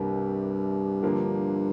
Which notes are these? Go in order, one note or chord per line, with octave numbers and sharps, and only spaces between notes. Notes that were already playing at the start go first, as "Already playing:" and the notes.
Already playing: C2 G2 C3 A#3 G4
D3 F3 A#3